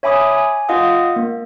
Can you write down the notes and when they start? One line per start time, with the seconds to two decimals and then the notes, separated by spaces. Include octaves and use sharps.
0.03 C#5 E5 G#5 B5 D6 D#6
0.31 G#5
0.69 F4 D#5 F5 F#5 D#6
1.16 A#3